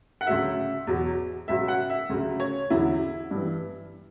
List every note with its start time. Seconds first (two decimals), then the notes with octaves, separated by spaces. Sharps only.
0.21 F#5
0.27 D2 C#3 F#3 E5
0.87 E2 B2 F#3
1.48 C#2 B2 F#3 E5
1.68 F#5
1.90 E5
2.10 D2 C#3 F#3
2.40 C#5
2.70 E2 D3 F#3 E4
3.31 G2 E3